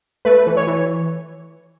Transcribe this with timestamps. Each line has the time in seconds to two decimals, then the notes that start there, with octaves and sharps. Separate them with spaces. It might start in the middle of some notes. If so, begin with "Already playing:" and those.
0.25 A3 B4
0.47 E3
0.57 C#5
0.67 E3